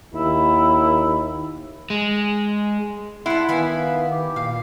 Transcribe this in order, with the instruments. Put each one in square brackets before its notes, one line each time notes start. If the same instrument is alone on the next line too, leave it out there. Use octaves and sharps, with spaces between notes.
[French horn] D#2 [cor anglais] E4
[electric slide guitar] G#3
[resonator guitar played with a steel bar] E4 [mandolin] B4 A5 [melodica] F#5 C6
[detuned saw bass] D#3 [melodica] B3 [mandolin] F5 G#5 B5
[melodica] G4
[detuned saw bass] A#2 [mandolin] F5